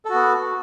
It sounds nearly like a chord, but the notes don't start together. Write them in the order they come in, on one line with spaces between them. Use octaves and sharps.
A4 F#4 B3